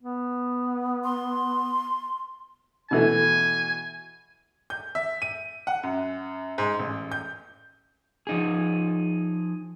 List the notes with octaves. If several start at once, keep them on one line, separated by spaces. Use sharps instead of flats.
B3
C6
B2 E3 A3 G#5
G6
E5
D#7
F#5
F#2
G#2
A1
G6
F3 D#4 G#4